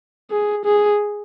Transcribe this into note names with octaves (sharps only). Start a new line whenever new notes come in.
G#4
G#4